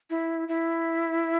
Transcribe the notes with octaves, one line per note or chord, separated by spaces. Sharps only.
E4
E4